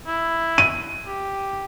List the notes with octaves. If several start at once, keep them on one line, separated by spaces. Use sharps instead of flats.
E4
D#7
G4